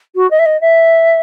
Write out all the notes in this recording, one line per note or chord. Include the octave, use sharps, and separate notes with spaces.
F#4
D#5
E5
D#5
E5